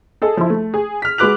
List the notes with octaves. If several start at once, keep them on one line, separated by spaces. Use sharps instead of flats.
G#4 A4 D#5
F3 E4
A3
G#4
F6 B6
G#3 F#4 B4 D6 F#6 F7